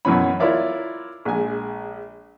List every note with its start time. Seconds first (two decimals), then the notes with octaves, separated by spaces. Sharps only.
0.05 F#2 B2 E3 C#4 B5
0.40 E4 F4 A#4 C#5 D5 E5
1.25 A#1 G#3 G#5